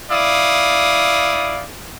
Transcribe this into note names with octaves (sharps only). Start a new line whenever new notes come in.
E4 D5 F5 D#6